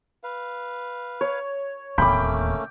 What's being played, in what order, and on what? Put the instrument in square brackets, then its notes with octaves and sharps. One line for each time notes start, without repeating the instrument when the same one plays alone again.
[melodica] B4 F5
[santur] C#5
[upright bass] D1 D#2 [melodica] A3 A#3 C#4 [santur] G5 D6 [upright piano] B5